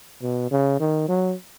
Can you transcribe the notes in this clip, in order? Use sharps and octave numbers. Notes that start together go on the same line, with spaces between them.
B2
C#3
D#3
F#3